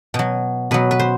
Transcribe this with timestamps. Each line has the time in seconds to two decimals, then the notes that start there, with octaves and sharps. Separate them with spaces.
0.14 B2 F#3
0.71 B2 F#3 B4
0.91 B4
1.00 C5